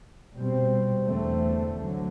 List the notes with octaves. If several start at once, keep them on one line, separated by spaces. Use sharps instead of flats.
B2 G3 C4
E2 D3 A3 C4
D2 D3 F#3